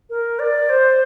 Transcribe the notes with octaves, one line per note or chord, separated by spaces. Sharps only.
A#4
D5
C5